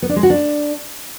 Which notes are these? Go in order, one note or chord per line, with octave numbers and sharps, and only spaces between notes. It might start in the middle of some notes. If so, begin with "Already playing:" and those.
B3
D4
G#3
F#4
D4